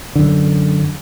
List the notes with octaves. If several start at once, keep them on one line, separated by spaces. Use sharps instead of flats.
F#2 D3